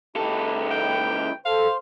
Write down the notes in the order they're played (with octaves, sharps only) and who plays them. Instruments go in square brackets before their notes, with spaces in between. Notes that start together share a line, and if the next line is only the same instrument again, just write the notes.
[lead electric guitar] C#2 A4 [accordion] D#4 E4 G4
[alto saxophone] G5
[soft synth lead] A4 [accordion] C5 C6 [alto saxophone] F5